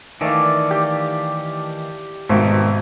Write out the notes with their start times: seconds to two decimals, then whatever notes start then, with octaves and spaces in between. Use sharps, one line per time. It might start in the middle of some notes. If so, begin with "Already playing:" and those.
0.21 D#3 E3 A3 D5 F5
0.71 G4
2.29 G#1 B2 D#3 A3